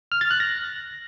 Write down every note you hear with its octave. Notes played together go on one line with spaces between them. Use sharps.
F6
A6
F#6
A#6